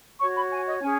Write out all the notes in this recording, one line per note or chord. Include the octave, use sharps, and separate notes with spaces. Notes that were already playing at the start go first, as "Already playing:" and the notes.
F#4 C#5 C#6
B5
G#5
D#5
C#4 G#4 G#5